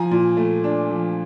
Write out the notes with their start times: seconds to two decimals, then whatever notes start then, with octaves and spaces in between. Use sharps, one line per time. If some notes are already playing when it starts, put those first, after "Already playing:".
Already playing: F3 G#5 A#5
0.11 A#2
0.37 A3
0.64 D4
0.90 F3